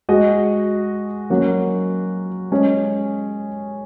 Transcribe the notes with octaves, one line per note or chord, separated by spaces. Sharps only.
G#3 F#4 D#5
F#3 A#3 C#4 F#4
G#3 C#4 G#4 D#5